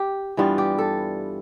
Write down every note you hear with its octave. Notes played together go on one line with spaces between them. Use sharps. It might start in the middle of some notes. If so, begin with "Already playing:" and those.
Already playing: G4
G2 E3 G3 B3 F4
G4
A4